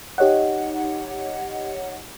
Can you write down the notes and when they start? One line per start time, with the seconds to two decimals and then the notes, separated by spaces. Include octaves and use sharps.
0.18 D#4 G4 C#5 D#5 F#5